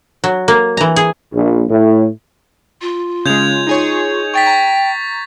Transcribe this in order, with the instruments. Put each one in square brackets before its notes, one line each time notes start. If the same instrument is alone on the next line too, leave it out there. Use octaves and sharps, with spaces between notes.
[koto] F#3
A#3
E3 A#5
G#4
[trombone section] A#1
A2
[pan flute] F4
[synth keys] C#3 G#3 [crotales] G6 G#6 F7
[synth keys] D#4 G#4 C#5
[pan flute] G5 [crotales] C#6 A6 B6
[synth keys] A#5